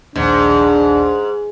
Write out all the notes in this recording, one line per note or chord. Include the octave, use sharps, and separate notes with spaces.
A#1 D#2 G#2 D4